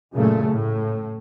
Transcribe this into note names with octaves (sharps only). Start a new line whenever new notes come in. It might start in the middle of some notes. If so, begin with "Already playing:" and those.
F#2 A#2 C#3 A3
A2